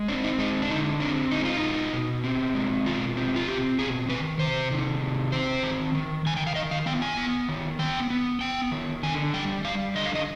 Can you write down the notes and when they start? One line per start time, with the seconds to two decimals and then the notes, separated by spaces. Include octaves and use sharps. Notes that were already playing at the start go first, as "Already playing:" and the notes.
Already playing: G#3
0.08 C4 D4
0.24 D#4
0.38 G#3 D#4
0.62 D4
0.70 D3 D#4
1.00 C4 D4
1.31 G#3 D#4
1.45 F4
1.57 D#4
1.62 B2
1.93 B2
2.24 C4
2.55 G#3
2.86 B2 F4
3.17 C4
3.36 F4
3.47 C4 G4
3.79 B2 G#4
4.09 D#3 B4
4.39 C3 C5
4.71 D#3
5.02 C3
5.32 C4 C5
5.63 D#3
5.95 D#3
6.26 D#3 G#5
6.37 G5
6.47 F5
6.55 D#3 D#5
6.71 F5
6.86 B3 G5
7.02 G#5
7.17 B3
7.49 D#3
7.79 B3 G5
8.10 B3
8.41 B3 G5
8.72 D#3
9.03 D3 G#5
9.33 G3 G5
9.65 G3 F5
9.95 D3 D#5
10.06 F5
10.15 D#5